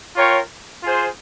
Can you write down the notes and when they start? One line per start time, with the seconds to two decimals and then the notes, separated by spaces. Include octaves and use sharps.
0.14 F4 A#4 C#5 G5
0.83 F4 G#4 C5